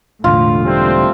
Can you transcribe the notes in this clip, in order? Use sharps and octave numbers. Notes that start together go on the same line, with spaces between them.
E1 A2 D3 F4
G3 A3 C4